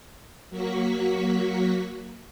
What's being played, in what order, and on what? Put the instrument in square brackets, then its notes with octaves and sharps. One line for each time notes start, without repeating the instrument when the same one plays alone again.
[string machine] F#3 A#3 F#4 C#6 B6